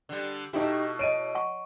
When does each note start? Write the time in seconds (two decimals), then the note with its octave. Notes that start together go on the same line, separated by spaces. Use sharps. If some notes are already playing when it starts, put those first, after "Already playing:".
0.09 D3 G3
0.53 B2 A3 D#4 E4 G4
0.99 C#5 D#5 D7 D#7
1.35 F#5 C#6